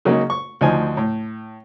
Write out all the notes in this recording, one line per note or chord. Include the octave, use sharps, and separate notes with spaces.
C#3 F#3 G#3 A#3 D#4
C#6
D2 F3 D#4 G#5
A2